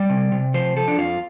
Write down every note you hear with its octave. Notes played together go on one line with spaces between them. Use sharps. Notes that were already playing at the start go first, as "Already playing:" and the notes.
Already playing: G3 D5
C3
C3
F3 C5
F3 A4
D4
F2 F4